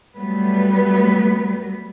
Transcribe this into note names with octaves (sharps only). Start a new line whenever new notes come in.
F#3 G3 A3 B3 B4